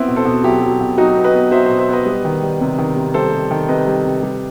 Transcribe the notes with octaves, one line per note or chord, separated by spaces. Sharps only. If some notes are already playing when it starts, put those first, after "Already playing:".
Already playing: B3 C4 E4
B2
A4 C5
B2
F#3 E4 G4
F#3
B2
F#3 D#4 F#4
B3
B4 D#5
B3
F#3 C5 E5
B2 C5 E5
C5 E5
B3 B4 D#5
G3
D#3
G3
C3
D#3
C3
G3 A4 C5
G3
D#3
C3 B4 D#5
G3
C3
G3